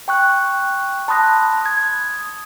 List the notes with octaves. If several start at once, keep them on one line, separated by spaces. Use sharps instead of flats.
G5 C#6 F#6
A5 B5 C6 D#6 F#6 A#6
D#6 G#6